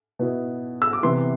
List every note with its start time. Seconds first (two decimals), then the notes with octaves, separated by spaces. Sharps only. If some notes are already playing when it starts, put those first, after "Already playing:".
0.19 B2 B3 E4
0.82 E6
0.93 D6
1.03 C3 E3 B3 E4 C6